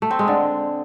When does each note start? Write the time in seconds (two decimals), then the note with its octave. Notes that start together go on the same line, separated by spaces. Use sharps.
0.02 A3
0.11 C4
0.19 G#3
0.28 D3